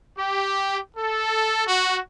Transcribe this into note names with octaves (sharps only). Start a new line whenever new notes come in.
G4
A4
F#4